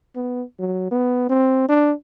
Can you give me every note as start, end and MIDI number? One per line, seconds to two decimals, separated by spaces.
0.16 0.43 59
0.59 0.89 54
0.91 1.29 59
1.29 1.65 60
1.69 1.92 62